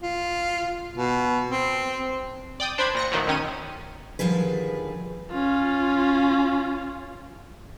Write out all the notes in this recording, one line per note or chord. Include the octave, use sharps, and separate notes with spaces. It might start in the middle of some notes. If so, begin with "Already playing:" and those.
F4
B2
C4
D5 G5 D#6
D4 C5 B5 G#6
A#2 A#6 C#7
A2 D#3 F3 F#3
B1 F#2 D#3 C#4 D#7
D3 D#3 F3 G3 G#4 B4
C#4 F4